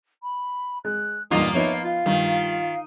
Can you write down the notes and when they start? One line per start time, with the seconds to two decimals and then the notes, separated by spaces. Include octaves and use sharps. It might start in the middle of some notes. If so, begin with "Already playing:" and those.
0.23 B5
0.85 G#3 F#6
1.31 E2 G2 A#2 A#3 D#4 F4 D#6
1.55 F3 B3 D#4 C#5 E5
1.84 F4 F5
2.06 G2 D#3